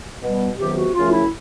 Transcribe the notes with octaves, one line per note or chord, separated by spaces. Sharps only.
B2 G3 B3
C#2 C3 D#3 F#3 B3 G4
F#4
F#2 C#3 F3 A3 F4
D#4
E4